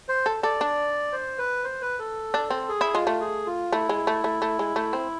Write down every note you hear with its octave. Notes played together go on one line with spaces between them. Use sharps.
C5
A4
A4 D5
D4
C5
B4
C5
B4
A4
D4
C4
G#4
E4
G#3 F4
A3
G#4
F4
A3 E4
G#3
A3
A3
A3
G#3
A3
C4